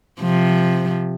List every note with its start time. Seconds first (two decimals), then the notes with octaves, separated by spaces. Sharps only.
0.21 C3 F3